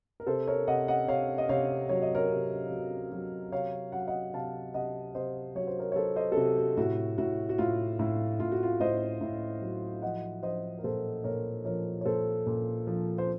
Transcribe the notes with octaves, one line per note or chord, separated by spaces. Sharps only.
A#4
C3 A4 C5
A#4 C#5
C3 D#5 F#5
D#5 F#5
C3 C#5 F5
D#5
C3 C#5 F5
F#3 C#5
D#5
A#4 C#5
C3
F#3
F#3
C3 C#5 F5
F#3 F#5
F5
D#5 F#5
C3 F5 A5
C3 D#5 F#5
C3 C5 D#5
F#3 C#5
C5
A#4 C#5
C#5
F#3 A4 C5
C5 D#5
A4
C3 F#4
F#4
A2 F#4
A2 F#4
F#4
A2 F4
A2
A2 F4
F#4
F4
A2 C5 D#5
A2
F#3
F3 D#5 F#5
F3 C5 D#5
A#4
A#2 A4 C5
A#2 A#4 C#5
F3 A#4 C#5
C#5
A#2 A4 C5
A#2
F3
C5